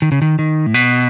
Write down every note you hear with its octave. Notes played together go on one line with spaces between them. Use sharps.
D#3
C#3
D#3
D#3
A2
B2